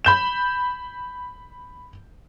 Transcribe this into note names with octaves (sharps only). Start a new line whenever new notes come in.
B5 G6 E7